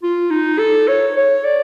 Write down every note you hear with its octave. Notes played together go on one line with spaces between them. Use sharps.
F4
D#4
A4
C#5
C#5
D5